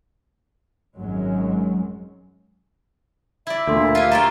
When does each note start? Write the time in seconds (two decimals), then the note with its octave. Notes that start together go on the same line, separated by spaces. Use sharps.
0.99 G#1 F#2 F#3 G#3
3.47 E4 D5 E5
3.67 D2 A#2 D4 A4 C6
3.95 F4 G4 F5 G#5
4.11 A3 F4 G5 A#5 A6